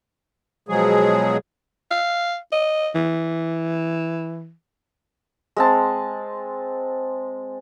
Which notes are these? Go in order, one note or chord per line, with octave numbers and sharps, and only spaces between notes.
B2 F3 F#3 G#3 G#4
F5
D#5
E3
G#3 C4 A5